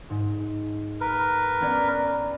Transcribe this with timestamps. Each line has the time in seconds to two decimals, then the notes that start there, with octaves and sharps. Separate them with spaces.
0.10 G#2
1.00 A#4 B4
1.60 B3 C#4 D5